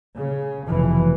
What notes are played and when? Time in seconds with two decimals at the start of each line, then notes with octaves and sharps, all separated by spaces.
0.16 C#3
0.68 F1 B2 E3